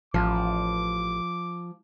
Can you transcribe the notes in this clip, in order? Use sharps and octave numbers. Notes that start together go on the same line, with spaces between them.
A1 F3 D6